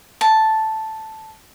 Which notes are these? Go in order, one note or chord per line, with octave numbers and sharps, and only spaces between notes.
A5